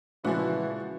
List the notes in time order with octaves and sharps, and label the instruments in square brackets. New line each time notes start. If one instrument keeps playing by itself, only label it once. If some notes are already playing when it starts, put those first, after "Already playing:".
[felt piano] A#2 C#3 G#3 [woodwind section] E3 [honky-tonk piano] F3 F#4